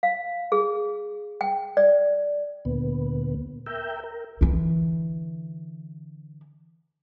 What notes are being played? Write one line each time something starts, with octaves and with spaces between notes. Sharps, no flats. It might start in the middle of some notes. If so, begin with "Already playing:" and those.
F5
G#4
G5
D5
D2 A#2 B3
A#4 E5 G5
A#4
D3 E3